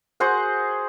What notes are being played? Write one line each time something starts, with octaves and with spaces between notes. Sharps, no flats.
F#4 G#4 C5 F#5